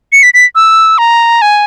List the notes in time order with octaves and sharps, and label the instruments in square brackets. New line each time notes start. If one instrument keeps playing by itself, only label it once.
[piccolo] C#7
B6
B6
E6
A#5
G#5